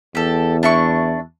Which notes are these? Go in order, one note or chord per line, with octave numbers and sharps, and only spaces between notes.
E2 G4 A4
D4 E4 C#6